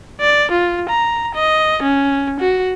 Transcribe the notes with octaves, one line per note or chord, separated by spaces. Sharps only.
D5
F4
A#5
D#5
C#4
F#4